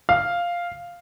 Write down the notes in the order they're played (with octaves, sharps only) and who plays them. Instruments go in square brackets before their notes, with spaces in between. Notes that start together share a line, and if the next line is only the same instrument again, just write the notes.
[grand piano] F5